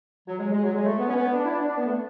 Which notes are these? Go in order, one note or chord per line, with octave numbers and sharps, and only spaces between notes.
F#3
G#3
G#3
F#3
G#3
A3
B3
C#4
B3
D4
E4
D4
D4
B3
A3